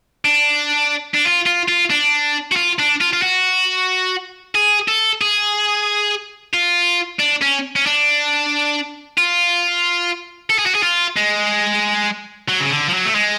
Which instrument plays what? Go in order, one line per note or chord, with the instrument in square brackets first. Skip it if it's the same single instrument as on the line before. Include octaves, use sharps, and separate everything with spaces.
[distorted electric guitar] D4
D4
F4
F4
F4
D4
F#4
F4
D4
F4
F4
F#4
G#4
A4
G#4
F4
D4
C#4
C#4
D4
F4
A4
G#4
F#4
G#4
F4
G#3
F#3
C#3
D3
F3
F#3
A3
G#3